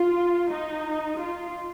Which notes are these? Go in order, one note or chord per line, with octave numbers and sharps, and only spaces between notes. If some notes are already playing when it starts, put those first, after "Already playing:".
Already playing: F4
D#4
F4